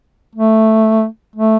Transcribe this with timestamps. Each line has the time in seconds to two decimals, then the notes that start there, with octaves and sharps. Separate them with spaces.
0.35 A3
1.36 A3